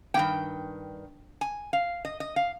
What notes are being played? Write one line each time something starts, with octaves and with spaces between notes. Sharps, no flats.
G2 D#3 A#3 G5
G#5
F5
D#5
D#5
F5